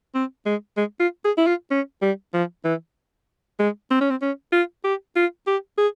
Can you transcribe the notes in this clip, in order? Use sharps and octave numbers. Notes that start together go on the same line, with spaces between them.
C4
G#3
G#3
F4
G#4
E4
F4
C#4
G3
F3
E3
G#3
C4
C#4
C4
C#4
F4
G4
F4
G4
G#4